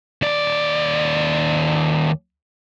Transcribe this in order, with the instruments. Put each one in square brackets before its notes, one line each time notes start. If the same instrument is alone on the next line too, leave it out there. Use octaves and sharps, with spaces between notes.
[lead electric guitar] D#2 D5